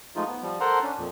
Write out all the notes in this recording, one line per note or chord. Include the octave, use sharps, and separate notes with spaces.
F3 G#3 A3 D#4 F4
B3
F3 G3
A4 A#4 C5 F#5 A#5 C6
C#4 D4
F2 A#2